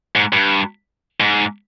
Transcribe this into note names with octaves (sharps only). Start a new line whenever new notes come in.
G#2
G2
G#2